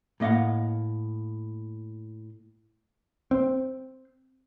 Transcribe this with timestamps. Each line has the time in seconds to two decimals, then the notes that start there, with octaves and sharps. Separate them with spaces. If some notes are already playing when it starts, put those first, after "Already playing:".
0.20 A2 A#3 D#5 F5 F#5
3.31 C4